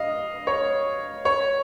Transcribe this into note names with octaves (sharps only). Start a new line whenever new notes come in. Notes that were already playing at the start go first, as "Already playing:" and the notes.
Already playing: D#5 F5
C#5
C#5